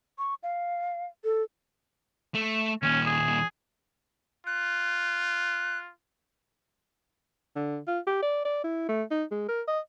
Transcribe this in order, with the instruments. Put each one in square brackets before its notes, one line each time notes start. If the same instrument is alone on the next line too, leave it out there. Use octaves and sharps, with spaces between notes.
[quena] C#6
F5
A4
[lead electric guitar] A3
[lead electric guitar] D#2 A#2 [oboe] C#4
[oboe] G#4
[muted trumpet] F4 [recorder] F#6
[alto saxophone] D3
F4
G4
D5
D5
E4
A3
D#4
G#3
A#4
D#5